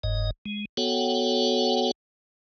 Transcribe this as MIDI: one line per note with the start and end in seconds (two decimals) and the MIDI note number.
0.03 0.31 30
0.03 0.31 44
0.03 0.31 75
0.46 0.65 56
0.77 1.91 59
0.77 1.91 66
0.77 1.91 69
0.77 1.91 73
0.77 1.91 78
0.77 1.91 79